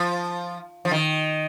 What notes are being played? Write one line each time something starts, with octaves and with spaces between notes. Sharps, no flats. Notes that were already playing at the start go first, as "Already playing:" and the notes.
Already playing: F3
F3
D#3